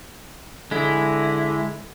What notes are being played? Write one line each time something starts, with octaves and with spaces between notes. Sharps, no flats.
D3 G#3 E4